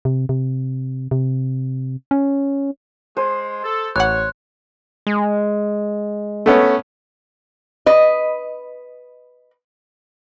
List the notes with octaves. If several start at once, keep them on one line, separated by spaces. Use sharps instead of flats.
C3
C3
C3
C#4
G#3 C5
A4
A1 C#5 F#5 F#6
G#3
A3 B3 C#4
B4 D#5